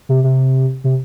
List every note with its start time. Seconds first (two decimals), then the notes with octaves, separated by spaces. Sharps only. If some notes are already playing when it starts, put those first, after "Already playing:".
0.09 C3
0.24 C3
0.84 C3